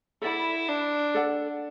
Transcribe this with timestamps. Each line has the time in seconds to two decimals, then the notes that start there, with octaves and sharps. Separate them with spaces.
0.22 E4 A4 D5 F#5 B5
0.68 D4
1.14 A4 D5 F#5